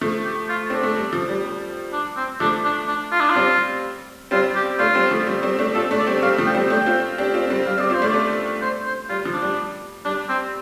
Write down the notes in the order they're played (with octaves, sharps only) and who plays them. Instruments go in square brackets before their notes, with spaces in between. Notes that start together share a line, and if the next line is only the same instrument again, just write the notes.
[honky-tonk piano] F3 A3
[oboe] G4
F4
[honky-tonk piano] C4 [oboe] D4
[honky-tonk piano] A3
G3
F3
G3
G3
[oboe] D4
C4
[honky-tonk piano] F3 A3 [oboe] D4
[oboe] D4
D4
F4
D4
F4
[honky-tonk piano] G3 C4
[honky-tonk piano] G3 C4 [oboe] F4
[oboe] G4
[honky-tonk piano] A3 D4 [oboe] F4
[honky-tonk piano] G3 C4
F3 A3
G3
G3 C4
A3 D4
[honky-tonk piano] C4 F4 [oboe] A4
[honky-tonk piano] A3 D4
[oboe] D5
[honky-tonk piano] G3 C4
[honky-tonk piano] G3 C4 [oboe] F5
[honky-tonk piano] F3 A3
[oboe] G5
[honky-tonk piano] G3 C4
[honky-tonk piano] A3 D4 [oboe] G5
[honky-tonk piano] C4 F4
D4 G4
C4 F4
G3 C4
[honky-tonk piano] G3 [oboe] F5
[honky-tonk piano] G3 C4 [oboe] D5
[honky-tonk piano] C4 F4
[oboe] C5
[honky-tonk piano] A3 D4
[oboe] D5
[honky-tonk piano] A3 D4
[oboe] C5
C5
[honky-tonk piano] G3 [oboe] F4
[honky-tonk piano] F3
[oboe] D4
[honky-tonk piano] G3
[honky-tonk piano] G3 [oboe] D4
[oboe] C4